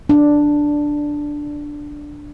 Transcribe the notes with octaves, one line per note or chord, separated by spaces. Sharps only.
D4